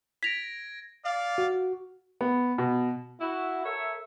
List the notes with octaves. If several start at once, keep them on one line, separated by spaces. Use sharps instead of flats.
G#6 A#6 B6 D7 F7
D5 F5
F#4
B3
B2
E4 F#4
A4 A#4 C#5 E5